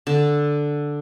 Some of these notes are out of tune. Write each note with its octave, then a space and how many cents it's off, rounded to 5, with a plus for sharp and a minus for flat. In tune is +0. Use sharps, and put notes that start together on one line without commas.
D3 +0 A5 +0